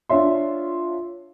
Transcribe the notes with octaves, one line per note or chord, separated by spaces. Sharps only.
D4 F4 C#5 E5 C6